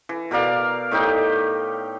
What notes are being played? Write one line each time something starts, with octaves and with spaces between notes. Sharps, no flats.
E3
B2 A#4 D5 F5
A2 D#4 G4